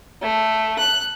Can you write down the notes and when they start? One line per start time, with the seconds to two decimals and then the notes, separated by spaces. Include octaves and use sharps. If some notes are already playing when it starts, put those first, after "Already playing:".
0.22 A3
0.79 F#6